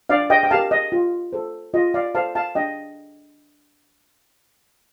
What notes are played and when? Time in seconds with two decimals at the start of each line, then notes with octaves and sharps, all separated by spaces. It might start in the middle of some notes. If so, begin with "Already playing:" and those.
0.09 D4 D5 F5
0.30 D#5 G5
0.43 G5
0.51 G4 A#4 F5 A5
0.71 D#5
0.92 F4
1.33 A4 C5
1.74 F4 D#5
1.94 D5 F5
2.15 A4 C5 F5 A5
2.35 F5 A5
2.55 D4 D#5 G5